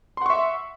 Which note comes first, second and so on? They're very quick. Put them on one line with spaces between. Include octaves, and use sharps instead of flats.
C6 F#5 C#6 E5